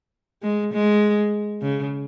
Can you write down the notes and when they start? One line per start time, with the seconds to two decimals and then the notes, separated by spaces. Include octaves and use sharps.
0.43 G#3
0.73 G#3
1.62 C#3